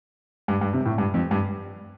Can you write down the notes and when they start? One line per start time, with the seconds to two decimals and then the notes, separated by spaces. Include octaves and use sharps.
0.48 G2
0.61 G2
0.74 C3
0.85 A2
0.98 G2
1.14 F2
1.31 G2